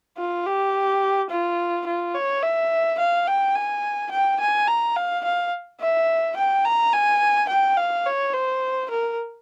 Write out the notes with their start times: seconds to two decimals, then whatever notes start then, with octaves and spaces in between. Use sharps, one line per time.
0.18 F4
0.46 G4
1.30 F4
1.86 F4
2.15 C#5
2.43 E5
2.99 F5
3.27 G5
3.55 G#5
4.11 G5
4.40 G#5
4.68 A#5
4.96 F5
5.24 F5
5.81 E5
6.36 G5
6.65 A#5
6.93 G#5
7.49 G5
7.77 F5
8.06 C#5
8.34 C5
8.90 A#4